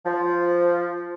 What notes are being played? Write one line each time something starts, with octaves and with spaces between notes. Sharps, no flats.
F3